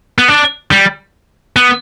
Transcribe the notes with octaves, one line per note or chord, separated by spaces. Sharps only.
B3
D4
G3
B3